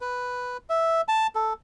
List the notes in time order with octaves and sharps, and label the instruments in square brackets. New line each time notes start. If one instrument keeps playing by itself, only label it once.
[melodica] B4
E5
A5
A4